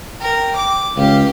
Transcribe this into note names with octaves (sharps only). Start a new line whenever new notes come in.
A#4 G5
D6
C#2 G4 F5